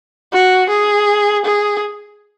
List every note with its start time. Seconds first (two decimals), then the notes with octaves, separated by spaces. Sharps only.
0.33 F#4
0.69 G#4
1.45 G#4